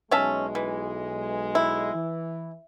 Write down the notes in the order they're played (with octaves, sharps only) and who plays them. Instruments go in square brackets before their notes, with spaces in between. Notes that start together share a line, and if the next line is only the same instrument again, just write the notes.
[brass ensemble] B1 G#3 [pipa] C#4 E5 A5
[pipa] E3
E4
[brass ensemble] E3